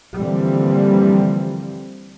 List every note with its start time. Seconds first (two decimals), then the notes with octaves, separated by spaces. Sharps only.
0.17 D3 E3 F3 G3 A#3 C4